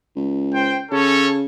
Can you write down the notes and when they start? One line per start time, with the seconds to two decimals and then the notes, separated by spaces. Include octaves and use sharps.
0.16 C#2
0.53 C5 G5
0.91 C#3 C#4 A4 C#5